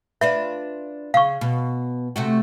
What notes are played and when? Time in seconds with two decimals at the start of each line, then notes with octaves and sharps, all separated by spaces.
0.21 D4 F4 B4 E5
1.14 C#3 F5 C#6
1.41 B2
2.16 C3 A3 F#4